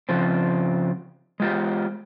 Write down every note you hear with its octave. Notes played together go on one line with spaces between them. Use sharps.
C#3 F3 C4
G#3 F4 G4